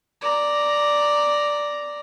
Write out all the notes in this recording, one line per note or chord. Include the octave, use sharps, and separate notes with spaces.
D5 A#5